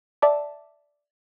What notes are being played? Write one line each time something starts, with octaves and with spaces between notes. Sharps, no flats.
D5 E5 A5 D6